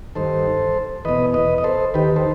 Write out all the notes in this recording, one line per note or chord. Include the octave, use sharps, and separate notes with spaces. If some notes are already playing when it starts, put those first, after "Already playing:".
G2 D#3 A4 C5
E2 B2 B4 D#5
B4 D#5
D#5
A4 C5
D#2 D#3 G4 B4
A4 C5